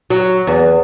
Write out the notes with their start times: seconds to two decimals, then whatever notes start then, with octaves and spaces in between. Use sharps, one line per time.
0.10 F#3
0.47 E2